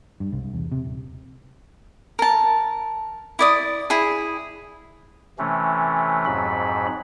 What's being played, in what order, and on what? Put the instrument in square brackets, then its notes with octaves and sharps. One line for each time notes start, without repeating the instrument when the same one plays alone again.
[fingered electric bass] G2
C2
E2
C3
D#1
[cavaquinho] A#4 A5
E4 D5 D#6
E4 G#4
[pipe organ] C3 E3 A3 C#4
F2 G#2 F#3 B5